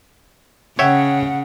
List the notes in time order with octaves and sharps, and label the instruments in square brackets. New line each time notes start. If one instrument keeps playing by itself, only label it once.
[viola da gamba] C#3 [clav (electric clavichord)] C#5 E5 G5 [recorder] F#5